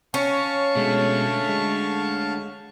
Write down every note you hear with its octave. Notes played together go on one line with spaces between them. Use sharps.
C#4 F5 A5 C#6
B2 D3 G#3 A3
G#3